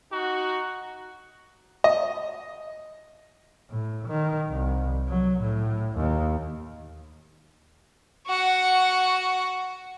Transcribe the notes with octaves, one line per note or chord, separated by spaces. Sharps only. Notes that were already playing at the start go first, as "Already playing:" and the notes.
D#4 F#4
D#5
A2
D#3
C2
F#3
A2
D#2
F#4 F#5